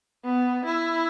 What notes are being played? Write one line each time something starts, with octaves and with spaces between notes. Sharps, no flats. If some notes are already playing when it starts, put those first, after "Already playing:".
B3
E4